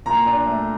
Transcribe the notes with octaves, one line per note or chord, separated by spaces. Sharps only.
A#2 A#5
D4
A3